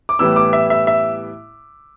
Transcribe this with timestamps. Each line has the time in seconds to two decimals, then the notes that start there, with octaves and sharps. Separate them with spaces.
0.09 D6
0.19 A2 E3 G3 B3 E4 E6
0.36 D6
0.53 E5
0.70 E5
0.87 E5